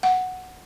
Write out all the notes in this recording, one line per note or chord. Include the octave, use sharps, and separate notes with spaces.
F#5